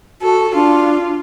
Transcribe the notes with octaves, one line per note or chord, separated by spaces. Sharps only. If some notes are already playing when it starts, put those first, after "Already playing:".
F#4 A4
D4 F4